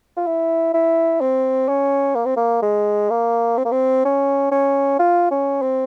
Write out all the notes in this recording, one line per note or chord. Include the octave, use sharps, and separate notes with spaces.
F4
E4
E4
C4
C#4
A#3
C4
A#3
G#3
A#3
C4
A#3
C4
C#4
C#4
F4
C#4
C4